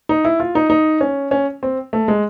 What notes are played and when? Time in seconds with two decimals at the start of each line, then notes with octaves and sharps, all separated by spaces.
0.09 D#4
0.25 E4
0.40 F4
0.55 D#4
0.70 D#4
1.01 C#4
1.31 C#4
1.63 C4
1.93 A3
2.08 G#3